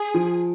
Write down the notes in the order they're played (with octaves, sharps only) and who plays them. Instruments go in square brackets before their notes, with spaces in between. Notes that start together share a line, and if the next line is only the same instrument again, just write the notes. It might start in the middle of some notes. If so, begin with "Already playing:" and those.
Already playing: [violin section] G#4
[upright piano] F3